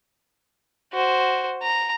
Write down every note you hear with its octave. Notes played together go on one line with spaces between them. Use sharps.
F#4 C5
A#5